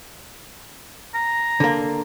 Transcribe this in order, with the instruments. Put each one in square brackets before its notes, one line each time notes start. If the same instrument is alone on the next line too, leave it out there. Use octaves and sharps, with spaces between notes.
[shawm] A#5
[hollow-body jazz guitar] D3 A#3